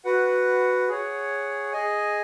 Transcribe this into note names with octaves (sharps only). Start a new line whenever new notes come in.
F#4 B4 F#5
G#4 C#5 F#5
G#4 D#5 G#5